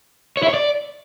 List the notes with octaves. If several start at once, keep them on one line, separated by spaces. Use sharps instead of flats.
C#5
E4
C#5
D5